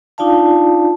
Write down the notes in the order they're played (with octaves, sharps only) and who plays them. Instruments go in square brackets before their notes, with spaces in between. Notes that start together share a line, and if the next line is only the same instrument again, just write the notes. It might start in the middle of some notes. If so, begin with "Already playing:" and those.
[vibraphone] D4 D#4 F4 D5 F5 A5